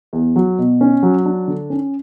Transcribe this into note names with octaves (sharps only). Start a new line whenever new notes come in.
E2
F#3
B2
C#4
F#3
D4
D3
C#4